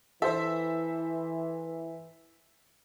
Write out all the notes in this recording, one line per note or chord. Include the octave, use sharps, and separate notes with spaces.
E3 A4 C5 E5